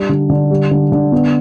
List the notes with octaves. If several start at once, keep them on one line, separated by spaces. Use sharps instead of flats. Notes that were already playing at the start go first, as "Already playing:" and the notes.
Already playing: G3 D4
D3
D3
G3
D3
D3
B3